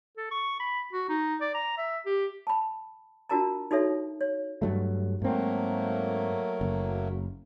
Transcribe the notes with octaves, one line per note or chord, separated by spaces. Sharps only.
A4
C#6
B5
F#4
D#4
D5
A#5
E5
G4
A5 B5
D4 F4 F#4 A#4 A5 A#5
D#4 F#4 A4 C#5 E5
C#5
G2 F#3 A3
G#2 F#3 A3 A#3 C4
F#1